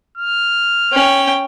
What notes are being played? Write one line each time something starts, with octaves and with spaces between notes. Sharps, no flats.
F6
C#4 G5